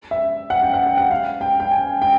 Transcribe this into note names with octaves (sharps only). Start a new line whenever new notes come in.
E5
F#5
G5
F#5
G5
F#5
F5
G5
G5
G#5
G5